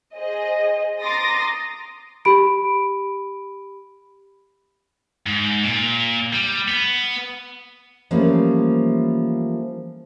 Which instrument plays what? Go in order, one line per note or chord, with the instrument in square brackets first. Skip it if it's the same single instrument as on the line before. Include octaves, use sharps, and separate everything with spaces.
[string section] G#4 C5 D#5
A#5 C6 D6 D#6 A6 A#6
[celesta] G4 B5 D7
[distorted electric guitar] G#2
A#2
G3
B3
[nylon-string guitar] E3 F3 G3 A3 A#3 C#4